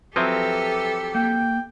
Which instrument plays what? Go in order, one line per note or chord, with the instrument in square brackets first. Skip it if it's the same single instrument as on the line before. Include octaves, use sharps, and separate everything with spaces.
[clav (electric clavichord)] F3 F#3 C4 [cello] G4 A4 [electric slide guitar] B4 E5
[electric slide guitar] A#3 [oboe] G5